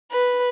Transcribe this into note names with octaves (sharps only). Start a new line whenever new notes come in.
B4